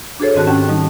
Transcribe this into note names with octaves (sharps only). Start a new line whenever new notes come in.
D4 F#4 G#4 A4 C5 C#5
G#2 D#3 C4 F#4 A5 F#6
C#4 G4 F#5 G5 A5
D#3 G3 D#4